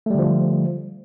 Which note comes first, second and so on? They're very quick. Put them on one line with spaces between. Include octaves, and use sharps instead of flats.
A3 G3 D3 F3